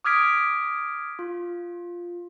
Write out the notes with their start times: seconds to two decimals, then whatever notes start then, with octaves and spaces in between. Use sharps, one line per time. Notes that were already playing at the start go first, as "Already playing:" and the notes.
0.05 D6 D#6 F6 G#6 B6 D7
1.19 F4